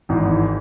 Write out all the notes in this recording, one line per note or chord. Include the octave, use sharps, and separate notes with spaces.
G#1 G#2 E3